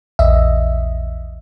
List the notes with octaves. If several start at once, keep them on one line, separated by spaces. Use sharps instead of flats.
A#1 E2 D#5 E5